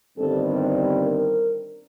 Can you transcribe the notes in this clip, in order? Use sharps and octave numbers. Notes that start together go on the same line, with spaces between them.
G1 G2 D#3 G3 C4 A4
A#4